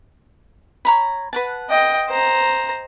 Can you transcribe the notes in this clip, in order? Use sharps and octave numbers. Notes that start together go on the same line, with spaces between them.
C#5 A#5 B5
B4 F#5 A5
D#5 G5
C5 A#5